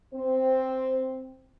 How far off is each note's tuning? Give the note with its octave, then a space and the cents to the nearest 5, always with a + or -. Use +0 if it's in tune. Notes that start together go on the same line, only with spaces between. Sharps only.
C4 +0 C5 -5